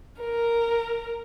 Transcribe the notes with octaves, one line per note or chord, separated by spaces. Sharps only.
A#4